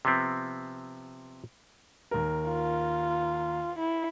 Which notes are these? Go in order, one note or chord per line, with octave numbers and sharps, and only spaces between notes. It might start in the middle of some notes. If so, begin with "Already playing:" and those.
C3 F3 B3 C4
D#2 A#4
F4
E4